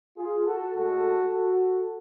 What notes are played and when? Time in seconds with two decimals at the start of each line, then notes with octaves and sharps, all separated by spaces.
0.17 F4 G#4
0.46 F#4 A4
0.74 A2 G#3 F#4 A4
1.32 F#4 A4